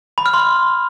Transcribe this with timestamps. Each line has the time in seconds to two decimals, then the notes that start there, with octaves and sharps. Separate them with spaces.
0.18 B5
0.26 F6
0.34 C6